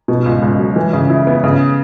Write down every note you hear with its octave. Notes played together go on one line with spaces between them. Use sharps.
B2
C#2
C#2
F#3
E3
C#3
E4
B3
C#3